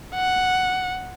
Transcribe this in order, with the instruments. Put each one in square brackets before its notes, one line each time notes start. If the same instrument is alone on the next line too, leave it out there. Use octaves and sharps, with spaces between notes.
[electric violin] F#5